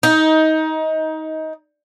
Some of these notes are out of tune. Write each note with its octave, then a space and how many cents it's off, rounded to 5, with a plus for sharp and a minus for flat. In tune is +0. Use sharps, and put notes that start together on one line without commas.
D#4 +20